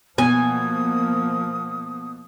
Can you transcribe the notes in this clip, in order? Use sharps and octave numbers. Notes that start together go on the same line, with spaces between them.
B2 F3 A#3 G#5 D#6